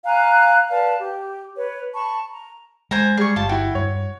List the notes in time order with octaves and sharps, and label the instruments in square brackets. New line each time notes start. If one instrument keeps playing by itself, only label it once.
[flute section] F5 G#5 A#5 F#6
B4 D5 F5 A5
G4
B4 C#5
A5 B5 C#6
A#5
[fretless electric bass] G#3 [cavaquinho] C5 G#5 A#5
[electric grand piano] G3 [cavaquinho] G#4 C#6
[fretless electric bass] G1 [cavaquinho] F4 A5
[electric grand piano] E4 G5 [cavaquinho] F#4
[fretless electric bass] G2 [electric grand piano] C#5